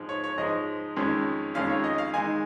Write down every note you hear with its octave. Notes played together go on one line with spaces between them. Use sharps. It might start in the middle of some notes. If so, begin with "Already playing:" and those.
Already playing: G#2 F3 G#3
C#5
C#5
G#2 F3 G#3 D#5
F2 D#3 G#3 C#4
F2 D#3 G#3 C#4 F5
C#5
D#5
F5
D#3 G#3 D#4 G#5